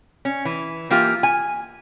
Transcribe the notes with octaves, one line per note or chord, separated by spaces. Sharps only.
C#4
E3
E3 A#3 F4 G4
G#5